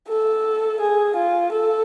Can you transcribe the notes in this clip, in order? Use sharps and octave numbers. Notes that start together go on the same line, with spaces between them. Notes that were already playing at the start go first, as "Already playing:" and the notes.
A4
G#4
F4
A4